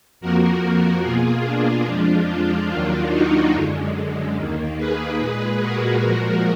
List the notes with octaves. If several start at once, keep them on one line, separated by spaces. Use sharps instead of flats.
F2 F3 A#3 F#4 A#4
B2 A#3 F4 G#4
D4 F4
F2 F3 G#3
D4 F4
D#2 D#3 F#3 A#3 D4 F4
D#4 F#4
F#2 D3 G#3
D#2 D#3 A#3
G#4 B4
A#2 G#3
F#4 A#4
A#2 F3 G#3 F#4 A#4